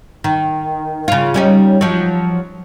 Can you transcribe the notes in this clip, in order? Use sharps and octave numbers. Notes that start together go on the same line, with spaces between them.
D#3
C#3 F4
G3 C#4 D#4
F3 F#3